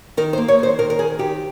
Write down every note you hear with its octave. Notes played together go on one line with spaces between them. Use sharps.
D#3 A#4
C5
A#3
C#5
D#3 C5
D#3 A#4
A#4
D#3 G#4
D#3 G4